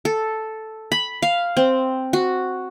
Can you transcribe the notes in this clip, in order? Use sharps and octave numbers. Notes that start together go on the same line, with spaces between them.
A4
B5
F5
C4
F#4